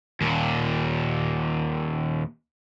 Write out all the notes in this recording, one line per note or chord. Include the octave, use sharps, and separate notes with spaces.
D#2 A#2